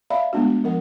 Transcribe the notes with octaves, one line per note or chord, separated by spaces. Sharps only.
D5 E5 F5 A#5 B5
G#3 A3 B3 D4 F#4
F3 A#4 F#5